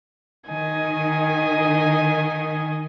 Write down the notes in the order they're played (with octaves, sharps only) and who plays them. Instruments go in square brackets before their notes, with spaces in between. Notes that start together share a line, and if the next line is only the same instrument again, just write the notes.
[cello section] D#3 [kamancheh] D#5 G#5